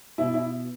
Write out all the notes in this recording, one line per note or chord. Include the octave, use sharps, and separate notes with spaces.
B2 E4
E4